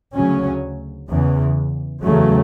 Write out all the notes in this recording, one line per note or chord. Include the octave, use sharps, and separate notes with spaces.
D2 C#3 F#3 C#4
E2 C#3 E3
E2 C#3 F#3 A3